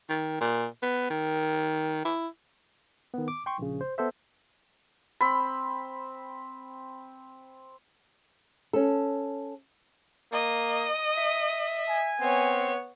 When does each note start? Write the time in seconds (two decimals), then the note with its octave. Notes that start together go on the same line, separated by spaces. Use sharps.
0.09 D#3
0.41 A#2
0.82 B3
1.10 D#3
2.05 E4
3.14 D#3 B3
3.28 D6
3.46 G5 C6 C#6
3.58 A#1 C#3
3.81 C5
3.98 B3 A4 C5 E5
5.21 C4 B5
8.73 C#4 A4
10.32 A#3 D#5
11.17 E5
11.88 G#5
12.21 B3 C4 C#5